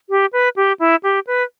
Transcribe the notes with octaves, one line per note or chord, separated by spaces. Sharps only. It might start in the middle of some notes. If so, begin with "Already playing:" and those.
G4
B4
G4
E4
G4
B4